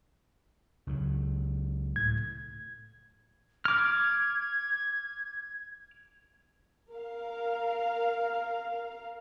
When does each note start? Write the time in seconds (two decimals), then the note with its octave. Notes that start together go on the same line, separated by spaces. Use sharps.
0.87 C#2 F#3
1.96 A2 G#6
3.65 D6 F6 G#6
6.93 A#4 F5